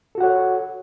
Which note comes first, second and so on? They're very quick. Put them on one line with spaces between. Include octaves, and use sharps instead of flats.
A4 F#4 F#5 C#5